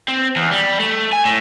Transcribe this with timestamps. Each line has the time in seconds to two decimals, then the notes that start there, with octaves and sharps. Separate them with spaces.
0.08 C4
0.36 E2
0.51 G3
0.80 A3
1.13 G#5
1.25 A2